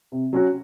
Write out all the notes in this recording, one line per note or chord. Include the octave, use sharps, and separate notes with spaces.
C3
F#3 C#4 F#4